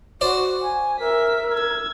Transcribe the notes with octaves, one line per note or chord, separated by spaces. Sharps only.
F#4 C5 D5
G#5
A#4 E5 B6
E6 G#6